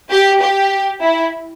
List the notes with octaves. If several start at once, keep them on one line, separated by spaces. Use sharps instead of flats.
G4
G4
E4